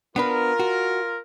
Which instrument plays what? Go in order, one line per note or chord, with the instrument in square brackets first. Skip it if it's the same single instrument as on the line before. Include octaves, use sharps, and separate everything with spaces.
[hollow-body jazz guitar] B3 D4 B4 [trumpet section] F4 A#4
[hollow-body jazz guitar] F#4